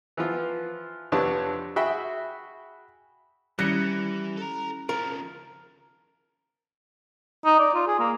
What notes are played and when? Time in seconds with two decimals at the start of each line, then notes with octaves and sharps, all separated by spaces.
0.17 E3 F3 B3 F4
1.12 F2 C3 B3 D4 C#5 A5
1.76 F#4 G#4 E5 G5 B5
3.59 D#3 E3 G3 C#4 E4 F#6 A#6 C#7
4.37 A4 A#5
4.89 C#3 F3 A#4
7.45 D#4
7.60 D5
7.75 F4
7.88 G#4
8.00 A#3